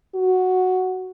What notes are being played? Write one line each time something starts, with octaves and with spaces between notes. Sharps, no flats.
F#4